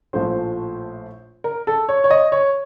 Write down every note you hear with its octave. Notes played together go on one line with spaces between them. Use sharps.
A#1 A2 F3 A3 C5
A#4
A4
C#5
C#5
D#5
C#5